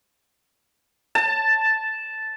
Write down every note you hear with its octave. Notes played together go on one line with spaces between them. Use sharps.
A5